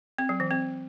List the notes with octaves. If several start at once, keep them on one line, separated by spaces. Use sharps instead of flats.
C4
F#3
E3
C4